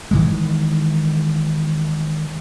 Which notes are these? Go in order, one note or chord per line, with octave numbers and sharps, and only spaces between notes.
D#3 E3 G#3